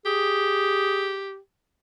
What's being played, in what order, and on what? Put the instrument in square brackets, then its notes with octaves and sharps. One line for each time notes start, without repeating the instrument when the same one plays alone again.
[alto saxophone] G4 [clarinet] G#4